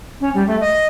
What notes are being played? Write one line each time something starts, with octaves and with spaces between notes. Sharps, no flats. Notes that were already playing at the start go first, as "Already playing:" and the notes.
C#4
G3
A3
D#5